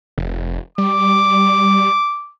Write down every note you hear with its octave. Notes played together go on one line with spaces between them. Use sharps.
F1
G3 D6